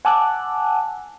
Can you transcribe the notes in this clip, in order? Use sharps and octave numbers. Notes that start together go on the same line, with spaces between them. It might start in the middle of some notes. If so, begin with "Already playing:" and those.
F#5 G#5 A5 D6 E6 F#6